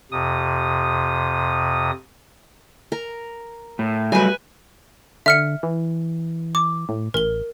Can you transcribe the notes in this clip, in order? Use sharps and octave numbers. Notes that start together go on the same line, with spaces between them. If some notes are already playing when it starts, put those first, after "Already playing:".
F2 C3 D#6
A#4
A2
F#3 G3 A3 B4 G#5
D3 E5 F6 C#7
E3
D6
A2
A1 A#4 G7